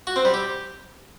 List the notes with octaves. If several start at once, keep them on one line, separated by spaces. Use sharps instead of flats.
F#4
C4
G3
G4